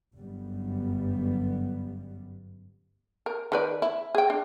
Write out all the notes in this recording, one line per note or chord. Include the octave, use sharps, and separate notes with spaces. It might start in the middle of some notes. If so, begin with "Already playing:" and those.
G1 F#2 G3 B3
A#4
D#3 B4 D5
E4
G#4 G5
D4